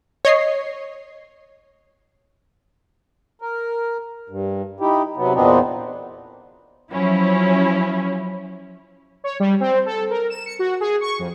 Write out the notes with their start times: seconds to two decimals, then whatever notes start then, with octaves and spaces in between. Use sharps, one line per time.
0.25 C#5 D#5 C7
3.42 A#4
4.29 G2
4.80 D#4 E4 G4
5.17 C3 F#3 B3
5.34 E2 A#2 B3 C4 D4 D#4
6.92 F3 F#3 C#4 E4
9.24 C#5
9.40 G3
9.60 C4
9.86 A4
10.10 A#4
10.30 E7
10.46 C#7
10.59 F#4
10.81 G#4
11.01 C#6
11.19 F2